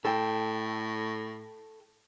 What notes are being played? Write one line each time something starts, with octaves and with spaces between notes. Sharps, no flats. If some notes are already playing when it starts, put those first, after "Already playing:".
A2 A4 G5